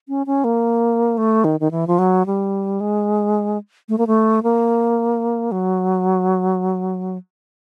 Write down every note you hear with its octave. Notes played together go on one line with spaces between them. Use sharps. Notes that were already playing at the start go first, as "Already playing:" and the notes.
C#4
C#4
A#3
A3
D#3
D#3
E3
F3
F#3
G3
G#3
A3
A#3
A3
A#3
F#3